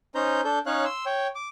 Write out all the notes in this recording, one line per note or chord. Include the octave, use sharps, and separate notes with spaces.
C#4 D#4 C5 A#5 G6
D4 A4 G6
C#4 D#4 C#5 F5 F#6
C6 E6
C#5 G5
D6